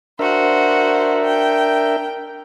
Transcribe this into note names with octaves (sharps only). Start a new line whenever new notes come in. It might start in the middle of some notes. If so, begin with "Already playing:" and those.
D4 F#4 A#4 C5 E5
G5